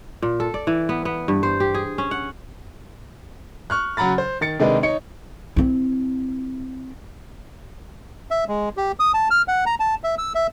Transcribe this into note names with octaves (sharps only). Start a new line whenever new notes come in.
A#2
A4
D5
E3
B3
B3
G2
C5
G4
G#4
C#4
F#5
C#6 F6 F#6
C#3 F#3 F#5 A#5 B5 A6
C5
D#3 A6 C#7
C3 D#3 G#3 D4 D#4 B4
D#4 C#5 C#7
C4 E4
E5
G#3
G4
D#6
A5
F6
F#5
A#5
A5
E5
E6
E5